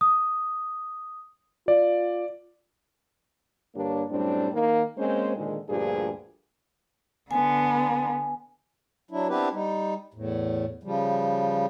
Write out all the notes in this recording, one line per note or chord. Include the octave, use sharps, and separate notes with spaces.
D#6
F4 D5
G2 D3 A#3 D4 G4 C#5
F#2 A2 G3 C4 D4
D#3 A#3
G#3 A#3 C4 C#4 C5
A#2 D3 D#3 F3 G#3
D2 G2 A#2 F3 G4 G#4
D3 B3 G#5
F#3 D4 E4
B3 C4 D4 E4 G4 B4
G3 D#4
E2 A2
C#3 F3 G3